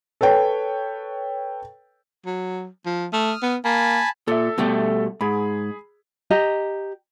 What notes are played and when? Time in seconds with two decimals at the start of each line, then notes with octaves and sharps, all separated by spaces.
0.21 A4 B4 C#5 G5
2.26 F#3
2.86 F3
3.13 A3 D#6 F6
3.43 B3
3.65 A#3 G#5 A5 B5
4.28 A#2 A4 E5
4.58 B2 G3 A3
5.21 G#2 G#4 B5
6.31 G4 D#5 A#5